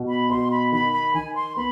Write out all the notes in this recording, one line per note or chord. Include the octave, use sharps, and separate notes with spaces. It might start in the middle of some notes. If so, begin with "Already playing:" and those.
Already playing: B2
B5
B2 C6
B5
D#3 B5
B5
D#3 G#5
C6
B3 B5